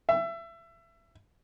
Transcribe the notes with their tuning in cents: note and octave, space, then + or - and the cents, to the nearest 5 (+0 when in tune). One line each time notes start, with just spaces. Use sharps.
E5 +25